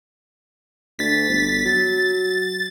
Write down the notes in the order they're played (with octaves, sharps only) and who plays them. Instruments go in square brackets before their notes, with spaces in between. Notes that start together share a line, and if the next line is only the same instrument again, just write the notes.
[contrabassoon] D2 [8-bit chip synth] A6 B6
[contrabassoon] G1
[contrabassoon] F#3 [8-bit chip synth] A6